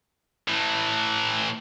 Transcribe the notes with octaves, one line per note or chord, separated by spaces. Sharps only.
A2 E3